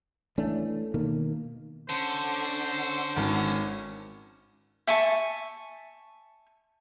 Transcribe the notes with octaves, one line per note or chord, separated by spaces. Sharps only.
E3 A3 C#4 D4
B2 D#3 A#3
D3 C#4 C5
G#1 C#4
E5 G#5 A5 C#6